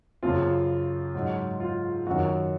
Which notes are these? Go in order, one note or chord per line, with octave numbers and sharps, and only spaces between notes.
F#2 C#3 F3 F4
G#2 F#3
F4
F#2 D#3 F#3 F#4